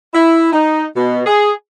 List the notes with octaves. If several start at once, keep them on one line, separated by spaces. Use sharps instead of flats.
E4
D#4
B2
G#4